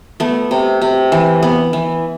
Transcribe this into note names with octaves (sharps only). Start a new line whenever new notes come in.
A3 B3
C3
C3
E3
B3
E3